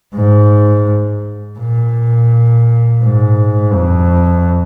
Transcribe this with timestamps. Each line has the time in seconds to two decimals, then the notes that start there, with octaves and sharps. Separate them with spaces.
0.15 G#2
1.59 A#2
3.03 G#2
3.74 F2